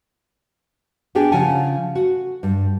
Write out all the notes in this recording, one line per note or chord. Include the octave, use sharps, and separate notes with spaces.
B3 D4 G4 G#4 G5 G#5
C#3 F3 F#5 G#5 A5
F#4
G2